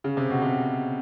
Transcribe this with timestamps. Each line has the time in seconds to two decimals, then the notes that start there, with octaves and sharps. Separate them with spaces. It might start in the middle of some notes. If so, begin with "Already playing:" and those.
0.04 C#3
0.17 C3
0.30 B2
0.42 C3